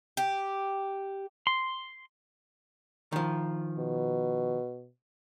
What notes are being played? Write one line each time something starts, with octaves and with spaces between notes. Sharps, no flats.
G4
C6
D#3 F3
B2